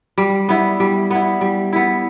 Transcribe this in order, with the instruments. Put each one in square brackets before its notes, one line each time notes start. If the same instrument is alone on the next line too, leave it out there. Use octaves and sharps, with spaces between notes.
[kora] G3
B3 E4
G3
B3 E4
G3
B3 E4